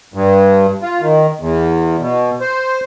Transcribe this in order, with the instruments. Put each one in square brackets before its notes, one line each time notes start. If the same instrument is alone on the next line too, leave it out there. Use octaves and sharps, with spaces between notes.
[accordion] G2
F4
D#3
E2
B2
C5